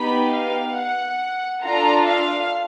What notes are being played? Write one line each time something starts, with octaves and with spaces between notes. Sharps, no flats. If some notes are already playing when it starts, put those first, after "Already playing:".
Already playing: B3 D#4 G4 B5
F5
F#5
D4 F4 A4 A#5
F5